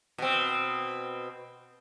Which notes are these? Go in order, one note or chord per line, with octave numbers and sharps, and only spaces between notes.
B2 C4